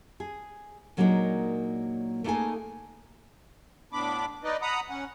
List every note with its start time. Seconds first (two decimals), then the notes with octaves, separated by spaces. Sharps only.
0.20 G#4
0.97 A#2 F#3 G#3 A#3 D4 D#4
2.24 A3 A#3 D#4 G#4 A4 G#5
3.93 A2 B3 D4 B5 D6
4.44 D#4 B4 D5 D#5
4.62 F#5 A#5 B5 D#6
4.89 C#4 F#5